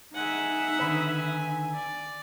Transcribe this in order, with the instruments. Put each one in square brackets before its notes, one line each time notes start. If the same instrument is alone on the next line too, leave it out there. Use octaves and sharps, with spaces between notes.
[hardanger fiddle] G#3 G#5 [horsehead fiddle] D#4 E5 [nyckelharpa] F#5
[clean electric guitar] D3 D#3 B4 [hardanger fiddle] G#5
[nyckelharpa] D5